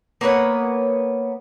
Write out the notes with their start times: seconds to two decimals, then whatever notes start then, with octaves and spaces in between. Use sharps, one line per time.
0.21 A#3 B3 C#5 F#5